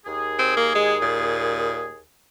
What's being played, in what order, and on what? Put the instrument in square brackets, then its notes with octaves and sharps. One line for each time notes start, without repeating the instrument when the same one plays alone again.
[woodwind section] D#2 G#4
[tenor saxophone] C4
A#3
G#3
A#2